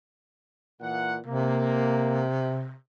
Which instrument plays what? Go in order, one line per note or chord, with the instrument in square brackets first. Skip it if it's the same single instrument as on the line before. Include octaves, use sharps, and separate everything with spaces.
[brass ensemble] A#2 E3 F#5
[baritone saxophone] C3 [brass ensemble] A#3